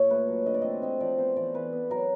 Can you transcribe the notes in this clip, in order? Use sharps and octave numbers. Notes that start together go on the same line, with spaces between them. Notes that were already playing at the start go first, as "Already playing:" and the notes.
Already playing: A#2 C#5
A3 B4
F#3
D3 D#5
D5
C4 D#5
C4 D#5
F3 D5
B3 C5
E3 D5
E3 B4
B3
F#3 A#4